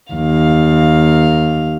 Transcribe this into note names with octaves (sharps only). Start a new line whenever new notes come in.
D#2 F5